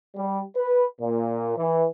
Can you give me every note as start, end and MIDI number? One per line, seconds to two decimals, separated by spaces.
0.16 0.41 55
0.57 0.86 71
1.01 1.55 46
1.57 1.86 52